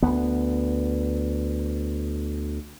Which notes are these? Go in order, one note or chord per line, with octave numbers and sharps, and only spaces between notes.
D2 B3